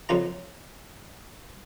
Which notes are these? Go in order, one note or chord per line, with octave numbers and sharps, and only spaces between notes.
F2 C#3 F4 A#5